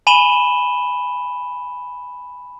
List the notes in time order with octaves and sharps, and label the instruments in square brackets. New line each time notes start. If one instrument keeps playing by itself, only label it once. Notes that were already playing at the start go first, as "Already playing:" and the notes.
[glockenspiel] G#5 B5 D#7 E7 F#7 G7